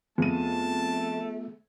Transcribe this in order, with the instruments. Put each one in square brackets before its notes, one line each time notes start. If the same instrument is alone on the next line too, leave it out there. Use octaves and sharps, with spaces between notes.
[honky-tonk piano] F2 D#7 [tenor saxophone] A3 [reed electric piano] B3 F4 G#4 [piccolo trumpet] A5